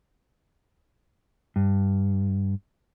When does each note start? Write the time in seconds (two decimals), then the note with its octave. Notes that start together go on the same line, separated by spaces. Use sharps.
1.56 G2